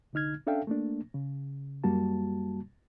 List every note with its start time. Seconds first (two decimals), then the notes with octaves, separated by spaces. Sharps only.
0.13 C2 D3 D#4 F6 G#6
0.47 C#4 D4 A4 E5 F5 G5
0.67 A3 A#3 D4
1.14 C#3
1.84 F#2 G3 A#3 F#4 A5